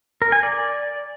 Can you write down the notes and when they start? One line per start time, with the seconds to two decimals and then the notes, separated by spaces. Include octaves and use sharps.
0.22 A#4
0.32 G#5
0.43 D5